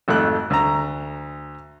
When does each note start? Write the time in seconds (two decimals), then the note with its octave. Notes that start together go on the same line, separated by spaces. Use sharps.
0.08 G#1 F2 A3 F#6
0.50 D2 A#5